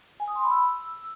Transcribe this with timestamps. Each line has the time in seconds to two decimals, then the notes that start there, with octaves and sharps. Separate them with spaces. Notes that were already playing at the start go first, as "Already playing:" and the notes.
0.20 G#5
0.28 D#6
0.35 C6
0.43 B5
0.51 E6